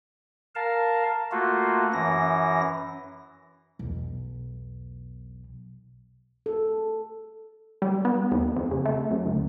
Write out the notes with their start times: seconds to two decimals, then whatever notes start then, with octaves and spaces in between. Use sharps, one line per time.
0.55 A#4 F5 A5
1.32 A3 A#3 F4 F#4
1.93 F#2 E3 A#6
3.79 B1 E2
6.46 A4
7.82 G3
8.05 B3
8.32 D#2
8.56 F2
8.71 C#3
8.85 A3
9.11 F#2
9.26 D2